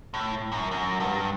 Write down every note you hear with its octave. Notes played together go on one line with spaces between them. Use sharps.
A2
F#2
F#2
G2